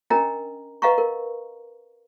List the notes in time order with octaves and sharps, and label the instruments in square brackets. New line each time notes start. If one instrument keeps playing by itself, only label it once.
[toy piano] C#4 D4 A#4 D#5 G5 A#5
B4 D#5 F5 F#5 A#5 C#6
A#4